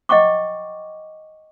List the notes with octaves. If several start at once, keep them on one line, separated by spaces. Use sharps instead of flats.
D#5 F#5 G5 C#6 D6